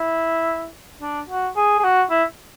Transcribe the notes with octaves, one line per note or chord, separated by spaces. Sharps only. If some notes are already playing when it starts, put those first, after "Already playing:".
Already playing: E4
D4
F#4
G#4
G#4
F#4
E4